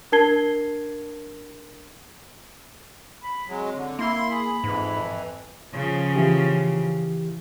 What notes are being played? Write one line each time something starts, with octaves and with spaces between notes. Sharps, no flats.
D4 A#4 A5 G#6 C7 G7
B5
F#3 G#3 C4
D3
A#3 E4 C6
G#4 B5
F2 G#2 E3
C#3 F3
E3 E4 G4